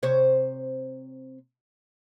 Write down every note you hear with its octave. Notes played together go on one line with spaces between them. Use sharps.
C3 C5 C#5